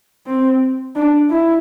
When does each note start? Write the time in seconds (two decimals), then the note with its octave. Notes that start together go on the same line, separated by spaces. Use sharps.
0.26 C4
0.96 D4
1.30 E4